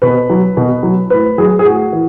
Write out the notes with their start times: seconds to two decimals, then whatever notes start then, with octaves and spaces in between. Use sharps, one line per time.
0.02 B2 B4
0.30 F#3
0.57 B2
0.83 F#3
1.10 A2 B4
1.38 F#3 G#4
1.59 G#4
1.65 A2 F#4
1.93 E3